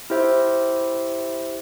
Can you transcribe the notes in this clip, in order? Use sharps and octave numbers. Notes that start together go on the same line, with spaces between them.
E4 G4 C5 E5